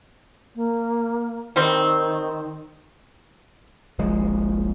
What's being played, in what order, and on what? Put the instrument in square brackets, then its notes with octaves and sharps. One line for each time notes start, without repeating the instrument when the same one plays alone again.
[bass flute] A#3
[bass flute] D#3 [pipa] G3 C4
[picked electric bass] D#1 A#1 F3 G#3